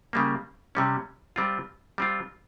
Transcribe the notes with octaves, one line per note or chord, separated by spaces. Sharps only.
C#3 G3 A#3
C3 G3 C#4
G3 C4 F4
G3 C4 F4